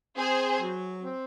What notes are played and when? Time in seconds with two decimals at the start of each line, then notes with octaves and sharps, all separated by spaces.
0.17 C4 G#4 C5
0.60 F#3
1.03 C4